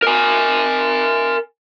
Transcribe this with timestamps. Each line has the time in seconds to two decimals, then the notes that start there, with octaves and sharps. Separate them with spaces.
0.03 A#4 G#5